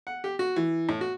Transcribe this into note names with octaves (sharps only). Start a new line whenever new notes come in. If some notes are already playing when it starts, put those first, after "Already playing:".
F#5
G4
F#4
E3
A2
F#4